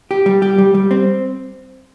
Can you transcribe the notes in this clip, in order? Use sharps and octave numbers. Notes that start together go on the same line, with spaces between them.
G4
G3
G4
G3
G3
C4